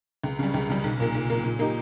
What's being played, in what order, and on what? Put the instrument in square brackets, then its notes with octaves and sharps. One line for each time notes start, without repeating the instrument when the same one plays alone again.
[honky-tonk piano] C#2
C#3 G3
C#2
C#3 G3
B1
A#2 A#3
B1
A#2 A#3
A#2
A#3 D#4 G4